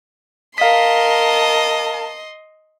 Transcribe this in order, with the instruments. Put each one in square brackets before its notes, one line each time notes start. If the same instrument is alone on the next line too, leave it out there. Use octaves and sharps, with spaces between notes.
[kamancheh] A#4 A5 [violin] D#5 C6 [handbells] F5 B6